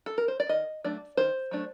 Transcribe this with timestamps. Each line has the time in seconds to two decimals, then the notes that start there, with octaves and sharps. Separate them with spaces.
0.06 A4
0.18 A#4
0.28 C5
0.40 D5
0.49 D#3 D#5
0.84 F#3 A3 D4 D5
1.17 D#3 C5
1.51 F#3 A3 D4